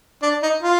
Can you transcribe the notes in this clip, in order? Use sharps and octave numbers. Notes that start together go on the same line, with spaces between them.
D4
D#4
F4